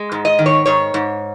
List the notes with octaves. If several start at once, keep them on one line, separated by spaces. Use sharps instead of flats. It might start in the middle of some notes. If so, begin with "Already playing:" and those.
Already playing: G#3
G#2
D#5
D#3
C#5
G#2 C#5
G#2